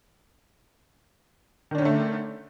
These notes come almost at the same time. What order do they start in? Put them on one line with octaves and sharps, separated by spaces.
D#3 D4 C#4 D3 A3